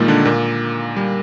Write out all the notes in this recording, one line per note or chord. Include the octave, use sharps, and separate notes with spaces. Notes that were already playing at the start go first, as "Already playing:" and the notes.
Already playing: A#2 D#3 G3 G#3 A#3 D#4
D3 D4
A#2 A#3
G3